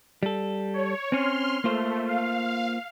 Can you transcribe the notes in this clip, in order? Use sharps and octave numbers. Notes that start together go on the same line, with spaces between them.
G3 A4
C#5
C4 C#4 C6 F6
A3 A#3 F4 C5
F5